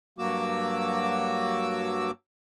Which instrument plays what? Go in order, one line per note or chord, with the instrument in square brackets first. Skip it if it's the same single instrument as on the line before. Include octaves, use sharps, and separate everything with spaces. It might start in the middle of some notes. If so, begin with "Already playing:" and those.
[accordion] G2 F#3 A#3 F#4 D6 E6